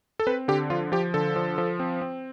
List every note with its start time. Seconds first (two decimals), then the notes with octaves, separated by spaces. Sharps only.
0.20 A4
0.27 C4 B4
0.48 D3 G4
0.70 F3 F4
0.92 F3 G4
1.14 D3 A4
1.36 F3
1.58 F3
1.80 C4
2.02 C4